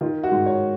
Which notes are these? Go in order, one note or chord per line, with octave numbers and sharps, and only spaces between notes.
D#3 F4
F#4
G#2
C#5